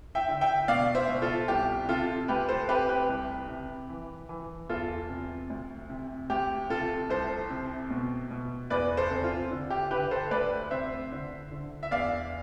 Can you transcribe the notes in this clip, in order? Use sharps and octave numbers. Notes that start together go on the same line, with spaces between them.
E5 G5
D3
E5 G5
B2 D5 F5
C5 E5
B2
F4 A4
C2 G4
C3 F4 A4
D2 G4 B4
A4 C5
C3 G4 B4
G4 B4
C2
C3
E3
E3
E2 F4 A4
C3
D2
C3
D2 G4
C3 F4 A4
C2 A4 C5
C3
B2
B2
E2 B4 D5
A4 C5
C3
F4
D3
G4
D3 G4 B4
A4 C5
D2 B4 D5
C3 C5 E5
D3
D3
E5
E2 D5 F5